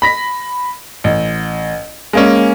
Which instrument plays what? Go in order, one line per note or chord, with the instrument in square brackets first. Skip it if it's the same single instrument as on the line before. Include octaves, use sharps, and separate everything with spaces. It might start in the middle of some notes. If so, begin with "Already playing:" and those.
[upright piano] B5 A#6 B6
A1
G#3 A#3 C#4